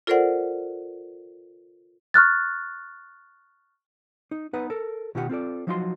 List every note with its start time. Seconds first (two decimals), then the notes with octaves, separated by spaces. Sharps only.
0.07 F4 A4 A#4 C5 D5 F#5
2.14 C#6 F6 F#6 A6
4.31 D#4
4.53 B3 D#4 B4 F#5
4.70 A4 A#4
5.15 B2 D#3 F4 G4 C5 F#5
5.29 C4 F4 A4 D5
5.67 F3 F#3 D#4 F4 F#4 C6